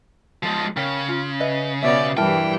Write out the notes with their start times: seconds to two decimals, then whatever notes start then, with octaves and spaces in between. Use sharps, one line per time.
0.43 F3 G#3
0.77 C#3 A#4 C#5 G5
1.08 F4
1.40 B4 D#5 E5
1.83 B2 B3 G4 C#5 D5 E5
2.17 G2 E3 G3 E4 A#4 G5 A5